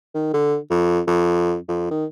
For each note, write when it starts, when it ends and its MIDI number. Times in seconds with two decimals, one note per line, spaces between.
0.15 0.33 51
0.34 0.57 50
0.70 1.00 41
1.07 1.57 41
1.68 1.89 41
1.91 2.05 51